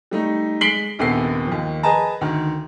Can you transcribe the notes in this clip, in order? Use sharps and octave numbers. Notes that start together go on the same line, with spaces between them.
G3 A3 D#4
G#3 B6 C7 D7 F#7 G7
A#1 D#2 C3 B3 A4 C7
D#2 F3
G#4 B4 D#5 A5 A#5
D2 D#3